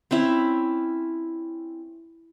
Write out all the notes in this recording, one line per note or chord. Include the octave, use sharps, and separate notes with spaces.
C4 C#4 E4 E5